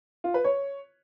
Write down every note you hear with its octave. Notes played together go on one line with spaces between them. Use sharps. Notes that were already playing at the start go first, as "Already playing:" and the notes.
F4
B4
C#5